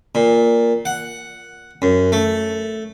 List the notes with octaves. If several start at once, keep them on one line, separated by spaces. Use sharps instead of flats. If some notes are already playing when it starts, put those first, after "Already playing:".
A#2
F#5
F#2
A3